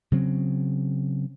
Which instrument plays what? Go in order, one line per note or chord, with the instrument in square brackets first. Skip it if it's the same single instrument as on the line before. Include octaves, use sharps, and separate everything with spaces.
[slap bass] C#3 F#3 C4